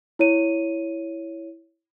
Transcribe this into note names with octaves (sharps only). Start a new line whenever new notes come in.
E4 C#5 D#7